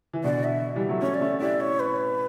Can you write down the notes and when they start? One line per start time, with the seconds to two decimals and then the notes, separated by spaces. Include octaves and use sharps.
0.13 E3
0.24 B2 D3 D5
0.44 E5
0.76 E3 G3
0.89 F#3 A3
1.01 A3 C#4 C#5
1.15 D5
1.21 A3 C#4
1.40 E4 G4 D5
1.61 C#5
1.80 B4